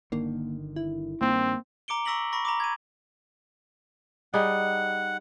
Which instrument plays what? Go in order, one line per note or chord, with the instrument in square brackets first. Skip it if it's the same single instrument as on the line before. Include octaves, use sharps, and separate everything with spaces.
[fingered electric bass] G1 D3 D#3 [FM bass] A#3
[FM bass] E4
[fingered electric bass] G2 D#3 [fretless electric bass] A#3 [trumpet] C4
[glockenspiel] A#5 D6 C#7 D7 G7
A#5 C#6 E6 A#6 B6 F#7
B5 C#6 A#6
A#5 B5 D6
G#6 D#7
[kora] G3 D#4 G#4 [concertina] F#5